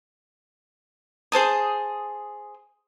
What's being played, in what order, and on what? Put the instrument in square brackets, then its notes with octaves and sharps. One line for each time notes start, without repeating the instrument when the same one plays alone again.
[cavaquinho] G#4 C5 A5 D#6